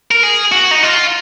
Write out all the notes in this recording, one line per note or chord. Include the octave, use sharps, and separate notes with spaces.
A#4
G#4
F#4
D#4
F4